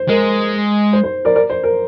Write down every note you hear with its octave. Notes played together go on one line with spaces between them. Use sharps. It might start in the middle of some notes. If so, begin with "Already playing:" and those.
Already playing: C5
G#3 A#4
C5
C5
A#4 D5
A#4 D5
C5
A#4